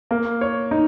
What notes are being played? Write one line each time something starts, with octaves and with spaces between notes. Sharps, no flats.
A#3
C#5
D#4